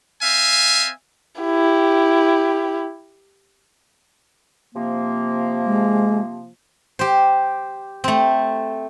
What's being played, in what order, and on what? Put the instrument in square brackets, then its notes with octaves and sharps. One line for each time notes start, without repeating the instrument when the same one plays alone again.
[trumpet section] C4 E5 F5 G#5
[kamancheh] E4 G4
[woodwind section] C3 F3 A#3
[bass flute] G#3
[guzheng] G4 C5
A3 C4